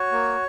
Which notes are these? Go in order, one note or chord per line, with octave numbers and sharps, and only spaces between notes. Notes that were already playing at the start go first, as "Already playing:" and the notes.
Already playing: F#4 C#5
A#3